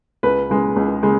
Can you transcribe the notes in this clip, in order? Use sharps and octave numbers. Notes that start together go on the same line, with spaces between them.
C#2 B4
C#3 G#3
C#2
C#3 G#3